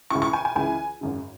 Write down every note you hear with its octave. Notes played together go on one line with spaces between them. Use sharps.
C#2 C#3 E3 C#6
C#6
G#5
G#5
C#2 C#3 E3 G#5
G#1 F#2 C#3